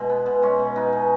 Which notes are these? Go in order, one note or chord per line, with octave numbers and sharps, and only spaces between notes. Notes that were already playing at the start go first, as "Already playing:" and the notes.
Already playing: B2 G#3 E4
B3
B2
G#3 C#4
B2
B3 D#4
B2